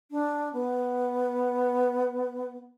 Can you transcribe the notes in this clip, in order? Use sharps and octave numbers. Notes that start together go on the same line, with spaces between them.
D4
B3